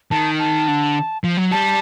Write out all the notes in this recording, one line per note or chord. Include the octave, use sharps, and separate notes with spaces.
D#3 A5
A5
D3
F3
F#3
G3 A5